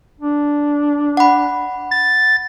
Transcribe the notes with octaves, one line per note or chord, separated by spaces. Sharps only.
D4
F#5 B5
A6